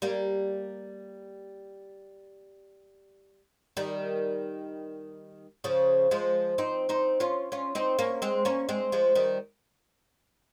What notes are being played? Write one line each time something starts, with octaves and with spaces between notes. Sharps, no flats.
G3 A#3
D#3 G3
C#3 F3
F3 G#3
C4 D#4
C4 D#4
C#4 F4
C#4 F4
C4 D#4
A#3 C#4
G#3 C4
A#3 C#4
G#3 C4
F3 G#3
D#3 G3